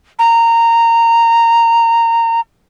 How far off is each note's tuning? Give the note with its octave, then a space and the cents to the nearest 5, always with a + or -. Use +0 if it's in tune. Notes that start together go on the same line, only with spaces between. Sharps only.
A#5 -15